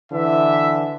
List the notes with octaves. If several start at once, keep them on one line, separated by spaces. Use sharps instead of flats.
D3 E3 E5